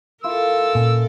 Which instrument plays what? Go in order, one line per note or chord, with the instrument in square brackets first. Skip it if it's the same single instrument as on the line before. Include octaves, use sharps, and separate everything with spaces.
[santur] E4 F4 D6 [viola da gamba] A4 A#4 [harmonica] E6
[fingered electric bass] A#2 [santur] C#4